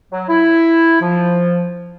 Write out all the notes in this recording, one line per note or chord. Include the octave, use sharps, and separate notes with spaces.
F#3
E4
F3